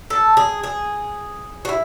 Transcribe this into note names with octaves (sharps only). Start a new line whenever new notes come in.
A4
G#4
G#4
F#4
E4